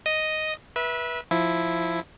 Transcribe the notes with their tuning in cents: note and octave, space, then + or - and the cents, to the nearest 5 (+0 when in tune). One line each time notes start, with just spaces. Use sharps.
D#5 +0 D#6 +0
B4 -25 E5 -10
F3 +0 E4 +0